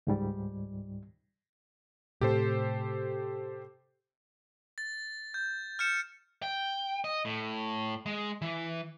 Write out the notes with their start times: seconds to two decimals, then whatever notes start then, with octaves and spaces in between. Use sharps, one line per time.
0.07 C#2 G#2 G3
2.21 A2 C3 G4 A4 C5
4.78 A6
5.34 G6
5.79 F6 G6 C#7 E7
6.43 G5
7.04 D#5
7.25 A2
8.06 G#3
8.42 E3